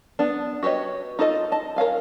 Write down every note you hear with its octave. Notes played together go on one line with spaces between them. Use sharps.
B3 D4
F#4 G4 B4 C#5 D#5
D#4 F4 A4 D5 D#5
D#5 A5
A#4 C#5 F5 G#5